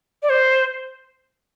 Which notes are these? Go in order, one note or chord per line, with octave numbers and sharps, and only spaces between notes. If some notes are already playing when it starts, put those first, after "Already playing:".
D5
C5